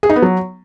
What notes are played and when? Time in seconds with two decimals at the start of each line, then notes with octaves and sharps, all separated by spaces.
0.03 G#4
0.09 D#4
0.16 B3
0.22 F#3